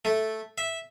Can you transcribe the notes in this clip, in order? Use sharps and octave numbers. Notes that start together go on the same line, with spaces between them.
A3
E5